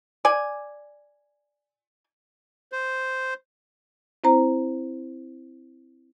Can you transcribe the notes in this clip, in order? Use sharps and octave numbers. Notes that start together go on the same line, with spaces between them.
D5 G#5
C5
C4 E4 C5 A#5